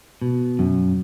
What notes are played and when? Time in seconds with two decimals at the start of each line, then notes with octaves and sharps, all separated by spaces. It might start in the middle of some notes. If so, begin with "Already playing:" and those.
0.22 B2
0.59 F#2